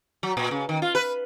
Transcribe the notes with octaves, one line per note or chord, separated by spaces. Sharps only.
F#3
A#2
C#3
D#3
F4
B4